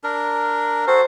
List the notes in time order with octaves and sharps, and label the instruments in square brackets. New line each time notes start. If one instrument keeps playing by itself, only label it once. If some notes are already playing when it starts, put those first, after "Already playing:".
[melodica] D4 A#4
[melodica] F#4 A4 [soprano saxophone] C5